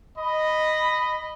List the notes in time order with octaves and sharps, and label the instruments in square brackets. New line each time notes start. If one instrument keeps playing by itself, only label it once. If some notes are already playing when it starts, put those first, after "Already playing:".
[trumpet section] D#5 B5